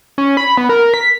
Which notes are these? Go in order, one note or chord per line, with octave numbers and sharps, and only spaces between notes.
C#4
B5
B3
A#4
B6